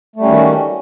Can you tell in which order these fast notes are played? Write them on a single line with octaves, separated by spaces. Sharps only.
A3 G3 C#4 D#3 F#4